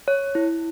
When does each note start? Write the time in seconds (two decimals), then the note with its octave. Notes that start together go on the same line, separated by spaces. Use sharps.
0.08 C#5
0.35 E4